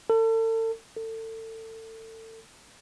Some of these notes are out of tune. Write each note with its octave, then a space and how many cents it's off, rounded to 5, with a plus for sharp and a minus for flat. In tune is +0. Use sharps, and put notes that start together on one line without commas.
A4 +40
A4 +30